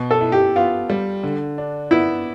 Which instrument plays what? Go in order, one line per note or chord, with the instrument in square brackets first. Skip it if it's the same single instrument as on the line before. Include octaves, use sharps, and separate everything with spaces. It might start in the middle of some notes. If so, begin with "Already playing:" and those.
Already playing: [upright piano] B2
[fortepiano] A4
[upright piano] E4
[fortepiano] G4
[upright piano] B3 [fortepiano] F4
[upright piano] G3
D3
D4
[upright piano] B3 [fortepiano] E4